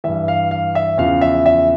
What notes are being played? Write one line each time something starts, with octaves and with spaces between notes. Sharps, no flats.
G2 E3 E5
F5
F5
E5
E2 C#3 F3 F5
E5
E5